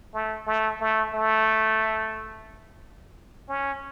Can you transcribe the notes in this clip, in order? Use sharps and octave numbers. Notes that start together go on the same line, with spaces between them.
A3
A3
A3
A3
C#4